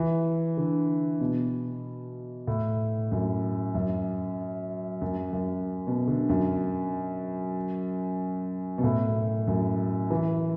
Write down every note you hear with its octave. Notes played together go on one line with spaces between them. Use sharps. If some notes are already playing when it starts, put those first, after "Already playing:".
Already playing: E3
D3
B2
A2
F#2
F#2
F#2
F#2
B2
D3
F#2
B2
A2
F#2
E3